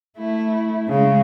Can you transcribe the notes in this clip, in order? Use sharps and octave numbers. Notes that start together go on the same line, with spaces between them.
A3 E4
C#3 G#3